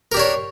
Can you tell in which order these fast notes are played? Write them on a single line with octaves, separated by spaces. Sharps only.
A#4 G4 D4 C#5